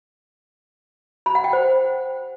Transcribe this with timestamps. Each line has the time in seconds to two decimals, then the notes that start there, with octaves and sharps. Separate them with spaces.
1.26 B5
1.35 F#5
1.44 G5
1.53 C5